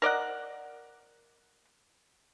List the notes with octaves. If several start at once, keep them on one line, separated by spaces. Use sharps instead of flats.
A#4 D5 D#5 F#5